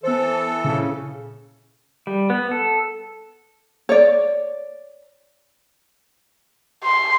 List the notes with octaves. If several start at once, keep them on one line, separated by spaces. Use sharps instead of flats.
E3 B3 A4 C5
A#2 C#3
G3
B3
A4
C#5 D5
C6